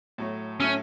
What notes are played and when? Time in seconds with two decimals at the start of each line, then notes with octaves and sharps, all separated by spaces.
0.18 A2 F#3 A3
0.60 A2 F#3 A3 C#4